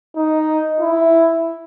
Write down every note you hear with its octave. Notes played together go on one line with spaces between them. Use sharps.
D#4
E4